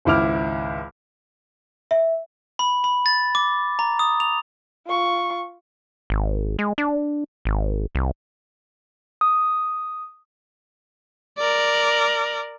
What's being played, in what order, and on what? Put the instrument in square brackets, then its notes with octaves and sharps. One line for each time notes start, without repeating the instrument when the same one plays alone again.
[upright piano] G#1 C#2 E4 D6 F6
[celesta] E5
[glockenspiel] B5
B5
A6
D6
A#5
D#6
F7
[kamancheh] F4 C#6
[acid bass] G#1
G#3
D4
G#1
C2
[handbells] D#6
[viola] A#4 D5